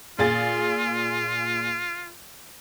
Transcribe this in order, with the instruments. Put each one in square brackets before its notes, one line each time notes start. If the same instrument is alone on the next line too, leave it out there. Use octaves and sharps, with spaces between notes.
[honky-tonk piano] A#2 G#4 A6 [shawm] F4